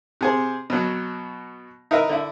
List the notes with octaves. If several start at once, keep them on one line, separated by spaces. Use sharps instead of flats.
C3 G#4 C5
B2 F#3
D#4 E4 A#4 B4 E5
D3 E4